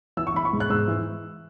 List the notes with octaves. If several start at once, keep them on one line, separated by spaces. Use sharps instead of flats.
E3 E6
C#6
E3 B5
C#6
G#2
F#6
G#2 E6
E3